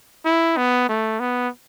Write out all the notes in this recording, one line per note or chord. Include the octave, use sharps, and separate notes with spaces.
E4
B3
A3
B3